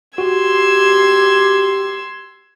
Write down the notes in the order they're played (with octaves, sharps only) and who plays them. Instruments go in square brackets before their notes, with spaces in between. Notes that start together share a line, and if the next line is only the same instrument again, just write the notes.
[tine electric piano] F#4 [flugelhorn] G4 [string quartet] C6 E6 G#6